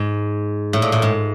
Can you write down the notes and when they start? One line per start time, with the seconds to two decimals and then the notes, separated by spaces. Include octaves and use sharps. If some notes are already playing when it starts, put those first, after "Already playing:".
Already playing: G#2
0.73 A2
0.82 A#2
0.92 A2
1.02 G#2